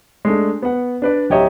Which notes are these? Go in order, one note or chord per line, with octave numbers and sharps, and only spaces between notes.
G#3 A3 D4
B3 F#5
D4 B4 D5
D1 G4 C#5 D#5 E5 A#5